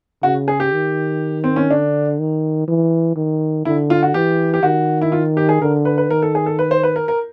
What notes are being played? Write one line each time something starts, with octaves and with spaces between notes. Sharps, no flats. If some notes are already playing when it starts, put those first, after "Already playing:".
C#3 F#4
G#4
G4
D#3
C4
C#4
D3 D4
D#3
E3
D#3
D3 E4
F4
F#4
E3 G4
G4
D#3 F#4
E4
F4
G4
G#4
D3 A#4
B4
B4
D#3 A#4
A4
G#4
A4
B4
C5
B4
A#4
A#4